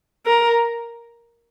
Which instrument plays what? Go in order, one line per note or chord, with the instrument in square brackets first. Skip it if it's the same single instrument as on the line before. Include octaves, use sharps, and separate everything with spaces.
[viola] A#4